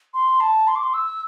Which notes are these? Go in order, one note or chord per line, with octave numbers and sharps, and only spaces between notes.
C6
A5
C6
D6
C6
E6